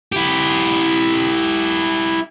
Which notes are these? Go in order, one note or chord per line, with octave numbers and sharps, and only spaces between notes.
E4 G4